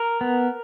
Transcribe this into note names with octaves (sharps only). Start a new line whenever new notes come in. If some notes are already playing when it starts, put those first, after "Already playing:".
Already playing: A#4
B3